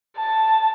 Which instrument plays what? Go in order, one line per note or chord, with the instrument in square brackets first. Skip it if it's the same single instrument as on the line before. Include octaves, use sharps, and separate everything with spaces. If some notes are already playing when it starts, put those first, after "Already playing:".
[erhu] A5